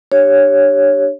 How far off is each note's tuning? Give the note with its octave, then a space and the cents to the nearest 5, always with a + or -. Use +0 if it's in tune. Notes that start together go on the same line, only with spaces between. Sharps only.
D4 +15 G4 +0 C#5 +0